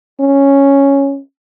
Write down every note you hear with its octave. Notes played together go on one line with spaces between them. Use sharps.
C#4